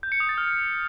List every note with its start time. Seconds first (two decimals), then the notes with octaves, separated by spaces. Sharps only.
0.03 G6
0.12 C#7
0.20 D#6
0.29 A6
0.38 F6